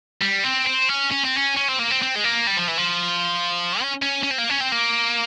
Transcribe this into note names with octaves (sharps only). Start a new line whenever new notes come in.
G3
C4
C4
C#4
C#4
C4
C#4
C#4
C4
A#3
C4
C4
G#3
A#3
G3
F3
E3
F3
C#4
C#4
C#4
C4
A#3
C#4
C4
A#3